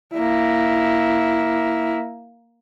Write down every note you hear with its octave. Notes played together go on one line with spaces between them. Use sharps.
A#3 E4